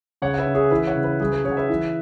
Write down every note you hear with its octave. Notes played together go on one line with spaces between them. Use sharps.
C#3 C#5 F#5
F#5
B4 E5
C#4
G#4 C#5
E3 B4 E5
C#5 F#5
C#3
B4
F#3 G#4
B4
C#3 G#4 C#5
F#5
B4 E5
E3